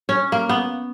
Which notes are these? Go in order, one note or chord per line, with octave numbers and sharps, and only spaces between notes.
C#4
A#3
B3